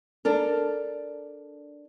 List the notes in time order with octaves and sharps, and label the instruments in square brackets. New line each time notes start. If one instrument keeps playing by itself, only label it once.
[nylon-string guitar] D4 A4 A#4